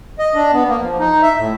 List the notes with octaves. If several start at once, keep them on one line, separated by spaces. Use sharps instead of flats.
D#5
D4
B3
A#3
F3
D#4
E5
A2